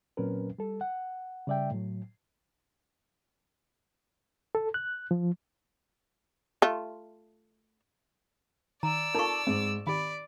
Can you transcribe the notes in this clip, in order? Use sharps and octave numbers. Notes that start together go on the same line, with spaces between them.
A#2 F#3 C4 C#4 A#4 B4
G3 A4
F#5
C#3 G3 D5 E5 G5
A2 F#3
A4
F#6
F3
A3 F4
D#3 D5 A#5 E6
D#4 F4 A4 A#4 A5 C#6
G#2 C4
D#3 G4 D5 B5